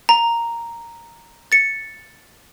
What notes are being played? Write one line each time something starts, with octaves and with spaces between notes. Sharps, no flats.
A#5
A6 C#7